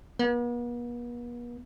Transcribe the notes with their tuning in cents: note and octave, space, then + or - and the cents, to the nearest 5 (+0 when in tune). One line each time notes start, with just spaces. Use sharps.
B3 -45